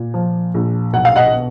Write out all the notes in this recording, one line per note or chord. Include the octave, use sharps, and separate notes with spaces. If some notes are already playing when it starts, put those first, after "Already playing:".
Already playing: A#2
F3
A#1
B1 F#5
F5
D#5 F#5
B2